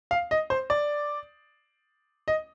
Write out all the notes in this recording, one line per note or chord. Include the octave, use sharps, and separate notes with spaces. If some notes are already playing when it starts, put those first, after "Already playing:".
F5
D#5
C5
D5
D#5